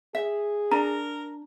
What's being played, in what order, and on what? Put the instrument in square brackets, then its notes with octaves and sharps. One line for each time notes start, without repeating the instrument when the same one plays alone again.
[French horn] G#4 [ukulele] E5
[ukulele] D4 [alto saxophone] A#4 [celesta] A#5